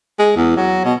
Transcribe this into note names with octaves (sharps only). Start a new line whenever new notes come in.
G#3
E2
F#3
B2